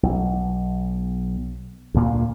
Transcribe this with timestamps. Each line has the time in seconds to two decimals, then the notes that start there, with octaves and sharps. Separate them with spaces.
0.03 B1
1.94 D2 A#2 A#3